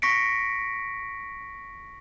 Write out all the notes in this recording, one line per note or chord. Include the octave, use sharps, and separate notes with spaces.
C#6 A#6 B6 C#7 D7